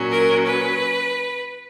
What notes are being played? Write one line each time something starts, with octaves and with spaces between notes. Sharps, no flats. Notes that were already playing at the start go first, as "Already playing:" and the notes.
Already playing: A#2 F#3 C#4
A#4
B4